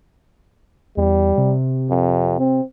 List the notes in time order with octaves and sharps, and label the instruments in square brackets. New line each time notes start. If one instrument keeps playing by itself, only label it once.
[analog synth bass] E2 [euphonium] G3
[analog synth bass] C3
[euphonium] F2
C4